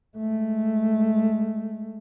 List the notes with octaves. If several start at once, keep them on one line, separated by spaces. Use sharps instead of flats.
G#3 A3